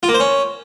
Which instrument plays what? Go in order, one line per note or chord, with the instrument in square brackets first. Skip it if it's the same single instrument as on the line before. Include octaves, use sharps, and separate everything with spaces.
[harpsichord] F4
A#3
C5
C#4